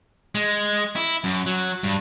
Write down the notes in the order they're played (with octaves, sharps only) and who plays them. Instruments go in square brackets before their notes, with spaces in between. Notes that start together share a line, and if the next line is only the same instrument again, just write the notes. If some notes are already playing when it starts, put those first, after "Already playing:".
[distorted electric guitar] G#3
E4
F#2
F#3
G2